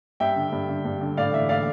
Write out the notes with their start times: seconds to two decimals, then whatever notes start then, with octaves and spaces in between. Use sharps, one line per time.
0.20 G2 E5 G5
0.36 D3
0.52 G2
0.69 D3
0.85 G2
1.01 D3
1.17 A2 D5 F5
1.33 E3 E5
1.49 A2 D5 F5